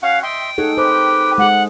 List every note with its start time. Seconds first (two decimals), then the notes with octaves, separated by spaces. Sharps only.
0.02 C#4 F#4 F5 F#5
0.23 D#5 E5 G5 C6
0.58 D#4 G#4 A4 C#5 F#5
0.77 G4 B4 C5
1.38 G#3 G#4 F#5